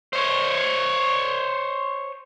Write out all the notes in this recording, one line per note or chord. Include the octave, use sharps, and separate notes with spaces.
C5 C#5